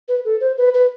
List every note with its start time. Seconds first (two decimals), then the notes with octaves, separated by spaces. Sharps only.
0.08 B4
0.25 A4
0.41 C5
0.58 B4
0.74 B4